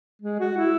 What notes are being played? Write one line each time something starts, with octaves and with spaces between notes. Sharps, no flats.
G#3
F#4
E4